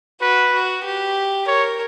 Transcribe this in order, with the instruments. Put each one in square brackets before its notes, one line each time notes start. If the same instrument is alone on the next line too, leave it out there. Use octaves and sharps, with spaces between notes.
[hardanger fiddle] F#4 [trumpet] B4
[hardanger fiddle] F#4
G4
[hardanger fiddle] A#4 [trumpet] C#5